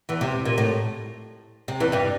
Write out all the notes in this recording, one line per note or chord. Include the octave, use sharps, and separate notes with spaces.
E2 E3
C3
A#2
A2
C3
E2 E3
G2 G3